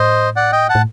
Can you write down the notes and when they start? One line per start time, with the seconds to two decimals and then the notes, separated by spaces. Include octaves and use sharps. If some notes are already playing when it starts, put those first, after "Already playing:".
Already playing: A2 C5 D#5
0.36 D5 F#5
0.52 D#5 G5
0.69 F#5 A5
0.75 A2